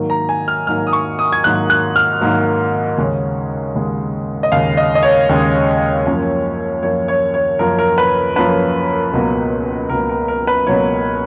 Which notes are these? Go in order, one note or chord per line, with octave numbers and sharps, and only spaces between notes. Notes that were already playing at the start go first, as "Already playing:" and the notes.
Already playing: G#2 D#3 F#3 A#3
A#5
G#5
F6
G#2 D#3 F#3 A#3 F6
D#6
C#6
D#6
G#6
G#2 D#3 F#3 A#3 F#6
F#6
F6
G#2 D#3 F#3 A#3
D#2 C#3 G#3 C#4
D#2 C#3 G#3 C#4
D#5
D#2 C#3 G#3 C#4 F5
D#5
D#5
C#5
D#2 C#3 G#3 C#4
F#2 F3 A#3 C#4
F#2 F3 A#3 C#4 C#5
C#5
C#5
F#2 F3 A#3 C#4 A#4
A#4
B4
F#2 F3 A#3 C#4 B4
C#2 B2 F#3 A#3
C#2 B2 F#3 A#3 A#4
A#4
A#4
B4
C#2 B2 F#3 A#3 C#5